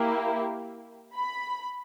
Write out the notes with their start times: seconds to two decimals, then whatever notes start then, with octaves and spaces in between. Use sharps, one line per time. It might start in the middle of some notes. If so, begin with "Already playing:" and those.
Already playing: A#3 E4 G4
1.14 B5